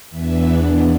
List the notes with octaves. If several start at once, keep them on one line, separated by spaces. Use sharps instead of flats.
E2 E3 B3 D4 B4 E5